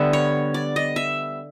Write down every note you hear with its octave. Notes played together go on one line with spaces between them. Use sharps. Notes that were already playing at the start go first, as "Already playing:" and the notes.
Already playing: D3 G3 B3 E5
C#5
D5
D#5
E5